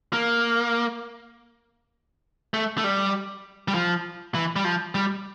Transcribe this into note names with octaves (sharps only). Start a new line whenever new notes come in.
A#3
A3
A3
G3
G3
F3
E3
G3
F3
G3